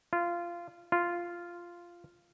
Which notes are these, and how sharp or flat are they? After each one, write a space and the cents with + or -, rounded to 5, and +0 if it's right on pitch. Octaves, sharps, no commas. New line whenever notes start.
F4 -15
F4 -5